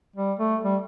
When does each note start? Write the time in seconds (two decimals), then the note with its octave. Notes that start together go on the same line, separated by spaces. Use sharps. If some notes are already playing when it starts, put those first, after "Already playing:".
0.16 G3
0.39 A3
0.64 G3